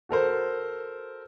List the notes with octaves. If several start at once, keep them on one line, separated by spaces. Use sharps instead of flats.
F#4 A4 A#4 C5